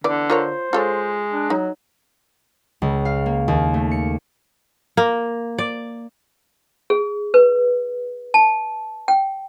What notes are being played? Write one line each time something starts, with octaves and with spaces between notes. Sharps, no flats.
D3 E3 B3 D5
F4 A#4 C5 C#5
G#3 F4 A4 C#5
D4
F#3 D#4
C#2
F5
A#3
D#2
A3
C#7
A#3
D5
G#4
B4
A5
G5